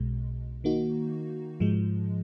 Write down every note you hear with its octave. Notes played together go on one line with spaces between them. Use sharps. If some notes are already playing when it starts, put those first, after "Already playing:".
Already playing: B1 B2 G#3
D#3 A#3 D#4 F#4
G#2 F3 G#3